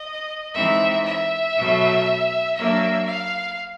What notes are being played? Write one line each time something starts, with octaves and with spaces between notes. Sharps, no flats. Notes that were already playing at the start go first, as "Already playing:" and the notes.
Already playing: D#5
E3 G#3 C4 D#4 E5
E5
B2 F#3 A3
F#3 A#3 D4 E5
F5